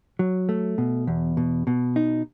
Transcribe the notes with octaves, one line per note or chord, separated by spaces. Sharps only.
F#3
A3
B2
E2
B2
B2
D#4